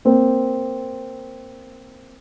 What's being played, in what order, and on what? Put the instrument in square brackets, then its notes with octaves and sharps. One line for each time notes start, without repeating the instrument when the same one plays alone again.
[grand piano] A#3 C4